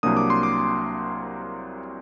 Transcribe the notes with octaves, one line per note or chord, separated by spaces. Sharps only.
C2 C3 F#3 A#3 D4 D#6
D6
C6
D6